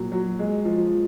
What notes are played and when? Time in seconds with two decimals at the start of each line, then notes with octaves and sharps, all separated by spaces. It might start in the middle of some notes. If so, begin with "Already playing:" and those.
Already playing: A#2 F#3
0.12 F#3
0.39 G#3
0.65 F3